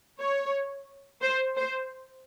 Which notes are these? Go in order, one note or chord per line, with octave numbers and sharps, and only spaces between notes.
C#5
C5
C5